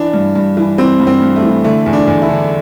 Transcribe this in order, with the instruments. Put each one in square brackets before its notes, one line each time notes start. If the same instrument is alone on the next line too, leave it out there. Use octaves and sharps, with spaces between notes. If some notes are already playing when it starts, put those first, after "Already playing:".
Already playing: [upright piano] E3 D4
G2
G2
E3
E3 C4
G2
C4
G2
A3
E3
D3 A3
E2
D4
E2
E4
D3